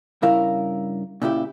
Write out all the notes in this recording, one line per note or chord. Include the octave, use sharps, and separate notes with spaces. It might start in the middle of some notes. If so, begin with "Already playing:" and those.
G2 C#3 E4 A#4 F5
A#2 C#3 E4 G4